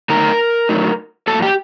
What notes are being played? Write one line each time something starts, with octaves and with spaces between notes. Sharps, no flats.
D3 F#3 A3 D#4 A#4 A#5
D3 F#3 A3 D#4
A2 F#3 A#3 A4 A5
G4 G5